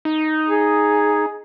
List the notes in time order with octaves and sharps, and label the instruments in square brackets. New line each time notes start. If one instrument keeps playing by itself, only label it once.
[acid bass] D#4
[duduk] G#4